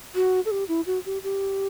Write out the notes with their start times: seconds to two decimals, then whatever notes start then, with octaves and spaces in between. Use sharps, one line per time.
0.15 F#4
0.45 A4
0.51 G4
0.68 E4
0.86 F#4
1.05 G4
1.23 G4